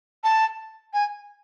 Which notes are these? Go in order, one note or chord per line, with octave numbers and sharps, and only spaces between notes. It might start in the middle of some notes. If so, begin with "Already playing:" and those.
A5
G#5